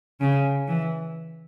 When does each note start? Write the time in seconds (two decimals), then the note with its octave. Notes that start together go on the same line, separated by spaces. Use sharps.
0.20 C#3
0.67 E3